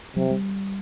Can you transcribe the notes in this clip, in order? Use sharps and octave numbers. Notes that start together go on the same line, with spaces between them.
C3 F#3
G3